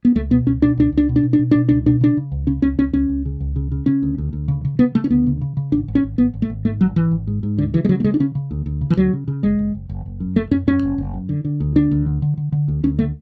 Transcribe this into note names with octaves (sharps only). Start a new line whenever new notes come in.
B3
C#2 A3
B2 B3
C#2 C#4
B2 D4
C#2 D4
C#2
D4
B2
D4
B2
D4
B2
B2 D4
C#2 D4
B2 D4
C#3 D4
C#3
C#2
C#3 C#4
C#2 C#4
C#2 C#4
C#2 C#4
C#2
C#3
C#2
C#3
C#3
C#3 C#4
D2
D2
D2
C#3
C#3
C#3 B3
C#3 A3
C#4
D2 B3
C#3
C#3
C#3
G#1 D4
G#1
C#4
G#1
G#1 B3
G#1
A3
G#1
G#2 A3
G#1 F#3
G#1 E3
G#1
G#2
G#2
D2 D3
C#3 E3
G#3
C#3 F#3
A3
C#3 G#3
D4
C#3 C#4
C#3
D2
D2
C#3
E3
D2 F#3
C#3
C#3
F#1 G#3
F#1
F#1
F#1
F#1
F#2
F#1 A3
F#2 C#4
F#2 C#4
F#1
F#1
F#2
D3
D3
D2
D3 D4
D2
D3
D3
D3
D3
D2
D2 C#4
D3 A3